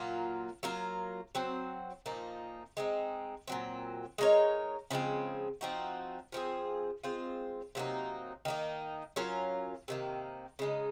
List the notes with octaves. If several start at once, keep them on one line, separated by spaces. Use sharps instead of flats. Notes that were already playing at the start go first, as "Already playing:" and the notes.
Already playing: A#2 F#3 A#3 F4
F#3 A#3 F4 A#4
F#3 C4 F#4 C5
A#2 F3 A#3 D#4
G#3 C4 D#4
A#2 F#3 C4
G#3 D#4 A#4 C#5
C#3 F3 G#3 C4
F3 C4 D#4 F#4
F3 C4 F4 G#4
G#3 C4 F4 C5
C3 F#3 A#3 D#4
D#3 A#3 D#4
F#3 C#4 F4 A#4
C3 D#3 A#3
C#3 G#3 D#4